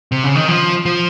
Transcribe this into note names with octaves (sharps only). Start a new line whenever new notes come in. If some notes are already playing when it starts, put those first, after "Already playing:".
C3
C#3
D#3
F3
F3